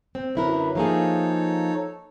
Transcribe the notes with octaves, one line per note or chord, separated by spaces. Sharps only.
C4
F#2 D3 F#3 E4 A#4 B4
F3 A#3 D#4 G#4 A4 C#5